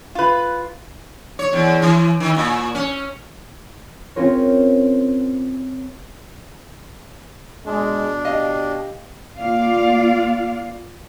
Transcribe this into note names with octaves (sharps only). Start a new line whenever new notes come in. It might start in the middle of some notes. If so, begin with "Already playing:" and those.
F4 B4
C#5
E2
E3
D#3
A#2
C#4
C4 C#4 F4 A#4 C#5
B2 G#3 D4
G4 D#5 F5
A#3 F4 D5 F5